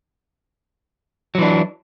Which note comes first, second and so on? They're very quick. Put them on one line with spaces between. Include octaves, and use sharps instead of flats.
F#3 E3 D4